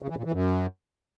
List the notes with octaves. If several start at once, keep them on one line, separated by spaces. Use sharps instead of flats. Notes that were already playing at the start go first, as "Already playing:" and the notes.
C#3
E3
A#2
E3
F#2